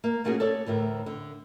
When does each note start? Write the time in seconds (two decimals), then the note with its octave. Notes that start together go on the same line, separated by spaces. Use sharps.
0.04 A#3
0.24 A#2 A3 A#3 C#4 F#4 G#4
0.40 A4 C#5 D5
0.66 D2 A2 E3 A#4
1.06 D3